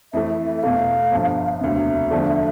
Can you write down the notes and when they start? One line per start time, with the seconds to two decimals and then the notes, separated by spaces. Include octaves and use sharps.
0.13 F2 E3 A3 E5
0.30 E5
0.46 E5
0.57 E5
0.63 E2 B2 A3 F5
1.11 G1 G2 F3
1.61 E1 D2 C3 E5
2.10 E2 D3 F3 A3 D4